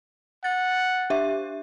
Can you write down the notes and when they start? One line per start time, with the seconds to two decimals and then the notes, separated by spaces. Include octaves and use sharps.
0.44 F#5 A6
1.10 D4 G4 E5